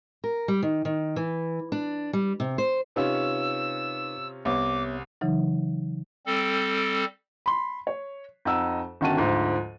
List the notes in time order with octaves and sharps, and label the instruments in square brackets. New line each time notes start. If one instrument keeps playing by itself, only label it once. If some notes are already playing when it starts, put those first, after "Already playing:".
[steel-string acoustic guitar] A#4
G3
D#3
D#3
E3
D4
G3
C3
C5
[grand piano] C3 C#4 F4 [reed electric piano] D#4 B4 [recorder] E6
[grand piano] C2 [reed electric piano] B3 C#5 E5 [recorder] D6
[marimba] C#3 E3 F#3 D#4
[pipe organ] G3 C4 A4
[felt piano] B5 C6
C#5
F2 D#4 D#5 F#5 E6
G1 D#3 C#4 F#4 A5 D#7
D2 G#2 F3